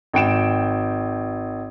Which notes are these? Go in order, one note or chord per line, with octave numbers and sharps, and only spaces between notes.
G#1 G5 D7 E7